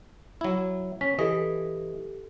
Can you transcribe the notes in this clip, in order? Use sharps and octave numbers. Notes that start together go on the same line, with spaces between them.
F#3 E4
C#4 B6
E3 G4 A4 D#5